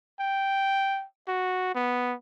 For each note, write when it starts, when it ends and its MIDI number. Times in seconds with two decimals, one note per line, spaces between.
0.20 1.05 79
1.28 1.71 66
1.75 2.14 59